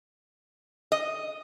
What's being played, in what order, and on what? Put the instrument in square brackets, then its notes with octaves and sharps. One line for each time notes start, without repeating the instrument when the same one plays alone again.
[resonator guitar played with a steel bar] D#5